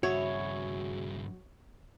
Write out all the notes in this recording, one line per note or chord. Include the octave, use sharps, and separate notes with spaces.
G2 C#3 E4 F#4 G#4 C#5